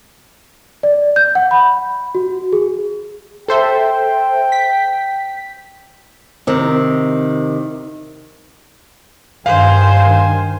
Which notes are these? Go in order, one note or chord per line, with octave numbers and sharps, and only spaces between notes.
D5
G6
F#5
B5
F#4
G#4
A4 C5 E5 G5
B6
C3 D#3
G2 D#3 C5 F5 G#5